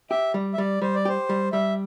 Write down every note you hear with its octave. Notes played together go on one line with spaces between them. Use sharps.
G4 E5
G3
E5
G3 D5
G3 C5
D5
G4 C5
G3
G3 E5